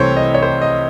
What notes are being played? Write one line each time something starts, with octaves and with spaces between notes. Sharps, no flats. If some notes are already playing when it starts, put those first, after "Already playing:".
Already playing: C2 C3 E3 A3 C4 C5 C#5
D#5
C#5
C5
D#5